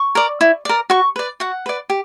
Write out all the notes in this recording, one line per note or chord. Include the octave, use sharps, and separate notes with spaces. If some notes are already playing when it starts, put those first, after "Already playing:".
Already playing: C#6
A#4 D5
E4
A#4 D5
F#4 C#6
B4 D5
F#4 F#5
B4 D5
G4